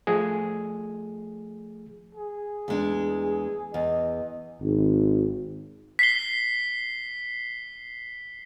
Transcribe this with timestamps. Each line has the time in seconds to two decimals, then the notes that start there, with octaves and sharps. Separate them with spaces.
0.07 F3 A3 G#4
2.15 G#4
2.68 E2 G#3 D4
3.74 E2 D#5
4.62 G#1
5.99 B6 C7 G7